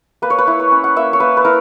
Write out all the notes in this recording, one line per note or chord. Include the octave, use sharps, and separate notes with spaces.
A#3 B4
C#5
B4
E4
C#5
C#4
F#5
A#3 E5
C#5
A#3 B4
B4
E4 A#4